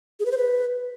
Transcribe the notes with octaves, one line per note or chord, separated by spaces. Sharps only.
G#4
B4
C5
B4